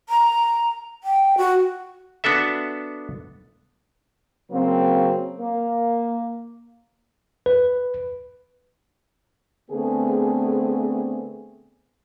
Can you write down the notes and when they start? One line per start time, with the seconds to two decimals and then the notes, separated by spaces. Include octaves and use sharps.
0.09 A#5
1.04 G5
1.38 F#4
2.24 B3 D4 F#4 A4 E5
4.52 C#3 F#3 A#3 C4
5.40 A#3
7.46 B4
9.70 D3 A3 B3 C4 G#4